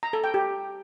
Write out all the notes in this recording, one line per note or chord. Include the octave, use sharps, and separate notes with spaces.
A#5
A4
G5
G4